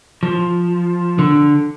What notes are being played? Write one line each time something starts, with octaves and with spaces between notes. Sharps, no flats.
F3
D3